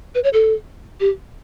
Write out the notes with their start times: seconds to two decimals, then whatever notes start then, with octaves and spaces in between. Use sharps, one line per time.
0.15 B4
0.24 C#5
0.33 A4
1.00 G4